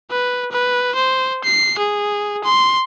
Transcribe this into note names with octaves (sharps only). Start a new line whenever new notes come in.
B4
B4
C5
C7
G#4
C6